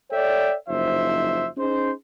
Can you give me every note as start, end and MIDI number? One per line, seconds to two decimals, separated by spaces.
0.11 0.55 69
0.11 0.55 73
0.11 0.55 74
0.11 0.55 76
0.11 0.55 79
0.68 1.47 30
0.68 1.47 53
0.68 1.47 63
0.68 1.47 72
0.68 1.47 76
1.57 1.91 61
1.57 1.91 63
1.57 1.91 68
1.57 1.91 72